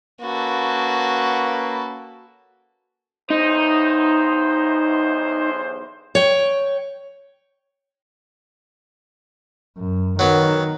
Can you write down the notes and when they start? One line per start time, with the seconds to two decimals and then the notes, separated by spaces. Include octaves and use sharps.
0.21 A#3 C#4 F#4 A4 B4
3.30 B1 E2 D#4 C5
6.15 C#5 G5
9.78 F#2
10.19 D#3 F#3 B3